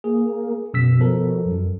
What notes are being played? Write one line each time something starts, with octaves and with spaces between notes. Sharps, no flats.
A#3 G#4
F#2 B2 E6 B6
F3 A4 A#4
F#2